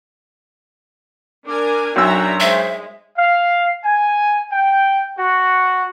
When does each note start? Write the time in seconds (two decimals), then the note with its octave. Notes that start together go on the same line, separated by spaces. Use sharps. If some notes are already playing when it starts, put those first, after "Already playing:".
1.47 D4 A#4 G#5 D6
1.96 B1 F#2 D4 F#4 E5 A#5 E6
2.40 G#3 C5 E5
3.17 F5
3.84 G#5
4.51 G5
5.18 F#4